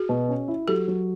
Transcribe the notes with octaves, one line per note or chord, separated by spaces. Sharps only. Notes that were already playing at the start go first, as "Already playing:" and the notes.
Already playing: F#4 G#4
B2
C#4
E4
F#3 G4 A4
F#3